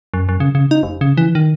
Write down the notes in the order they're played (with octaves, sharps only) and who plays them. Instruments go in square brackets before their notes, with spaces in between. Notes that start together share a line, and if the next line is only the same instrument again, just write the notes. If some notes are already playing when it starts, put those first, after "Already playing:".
[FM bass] F#2
F#2
C#3
C#3
D#4
F1
C#3
E3
D#3